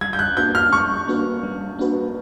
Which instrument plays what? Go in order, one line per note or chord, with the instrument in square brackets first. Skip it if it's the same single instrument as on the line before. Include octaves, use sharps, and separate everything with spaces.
[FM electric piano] G3 [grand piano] G#6
[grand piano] G6
F#6
[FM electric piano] A#3 D4 F#4 B4 [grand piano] G6
[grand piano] F6
[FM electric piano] G3 [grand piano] C#6
[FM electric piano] A#3 D4 F#4 B4
G3
A#3 D4 F#4 B4